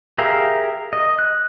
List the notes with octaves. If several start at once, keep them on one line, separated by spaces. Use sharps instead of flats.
G4 G#4 A#4 E5 F5
D#5
F#6